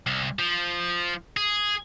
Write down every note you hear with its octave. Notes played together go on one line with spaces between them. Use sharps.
C2
F3
G#4